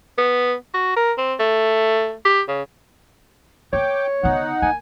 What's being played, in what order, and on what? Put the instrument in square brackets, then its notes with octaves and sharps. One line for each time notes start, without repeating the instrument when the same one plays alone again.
[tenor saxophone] B3
F#4
A#4
C4
A3
G4
C#3
[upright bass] A#3 [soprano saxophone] C#5 [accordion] G5 D6
[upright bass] D3 B3 [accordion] D#4 F#5
[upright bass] A#3 [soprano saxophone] G#5